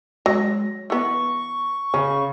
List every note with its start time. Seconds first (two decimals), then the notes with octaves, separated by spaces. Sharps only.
0.26 F#3 G#3 A#6
0.90 E3 B3 C#6
1.94 C#3 C#4